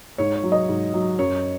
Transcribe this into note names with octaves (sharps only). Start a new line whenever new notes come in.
G#2 C#5
C#5
F#3
D#5
G#2
F#3
F#2 C#5